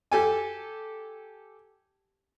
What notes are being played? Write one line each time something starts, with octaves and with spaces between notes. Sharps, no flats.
G4 A4 G#5